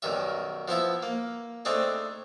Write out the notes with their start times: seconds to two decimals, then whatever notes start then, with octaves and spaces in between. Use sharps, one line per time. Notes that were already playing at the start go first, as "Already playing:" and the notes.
0.02 B1 F#2 D#3 G3 E5
0.68 F3 B3 E4 E5
1.03 A#3
1.65 A3 C4 D4 D#4 G#4